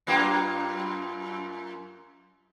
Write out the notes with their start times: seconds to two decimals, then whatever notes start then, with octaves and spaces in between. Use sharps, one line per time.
0.07 F#2 A#3 F4